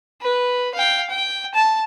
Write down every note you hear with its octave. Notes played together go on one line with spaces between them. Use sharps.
B4
F5 G5
G5
A5